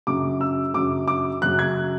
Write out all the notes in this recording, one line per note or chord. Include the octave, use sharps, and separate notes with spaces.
F#2 C#3 F#3 D6
E6
F#2 C#3 F#3 D6
D6
F#2 C#3 F#3 F#6
G#6